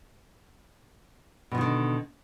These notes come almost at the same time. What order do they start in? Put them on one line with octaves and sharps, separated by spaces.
B2 F3 D#3 D3